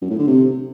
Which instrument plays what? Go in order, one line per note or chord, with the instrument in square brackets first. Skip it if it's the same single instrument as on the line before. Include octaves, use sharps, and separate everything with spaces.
[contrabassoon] F#2
A2
D3
C3